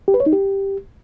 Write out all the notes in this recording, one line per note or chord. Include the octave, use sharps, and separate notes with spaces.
G4
B4
C#5
D#4
G4